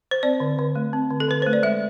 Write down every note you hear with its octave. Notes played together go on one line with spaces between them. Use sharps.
C5
C4 D5
D3
D3
A3
C4
D3
A4
D3 B4
A3 C5
D5
G#3 E5